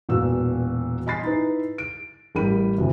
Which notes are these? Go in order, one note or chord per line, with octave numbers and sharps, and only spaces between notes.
E1 A#2 B3 F#4 F5 E6
D#5 G#5 B5 C6 A6 C7
D#4 E4 B4
D7
A1 G3 A#4 G5 B5 D#7
E1 D2 C3